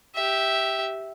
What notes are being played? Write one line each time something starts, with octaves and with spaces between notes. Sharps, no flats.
G4 E5